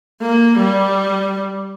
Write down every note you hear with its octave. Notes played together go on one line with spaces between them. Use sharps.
A#3
G3